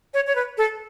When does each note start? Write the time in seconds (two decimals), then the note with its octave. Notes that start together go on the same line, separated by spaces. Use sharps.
0.14 C#5
0.27 C#5
0.36 B4
0.58 A4